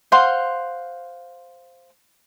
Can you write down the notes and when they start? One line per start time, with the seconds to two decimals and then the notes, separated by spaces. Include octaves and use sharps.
0.12 C5 F5 F#5 C6